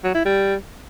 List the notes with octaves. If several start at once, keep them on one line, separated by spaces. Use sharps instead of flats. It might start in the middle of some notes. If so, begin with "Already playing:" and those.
F#3
E4
G3